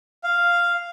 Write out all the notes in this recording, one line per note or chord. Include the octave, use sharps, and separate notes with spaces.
F5